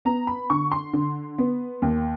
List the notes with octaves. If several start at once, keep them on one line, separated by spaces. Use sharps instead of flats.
B3 A#5
B5
D3 C#6
C6
D3
B3
D#2